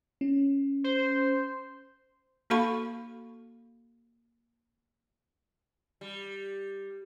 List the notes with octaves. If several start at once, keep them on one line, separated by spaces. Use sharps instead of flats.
C#4
C5
A#3 F#4 A4 F5 B5 C#6
G3